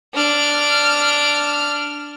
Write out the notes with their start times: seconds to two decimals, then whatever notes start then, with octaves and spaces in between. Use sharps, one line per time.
0.14 D4 F6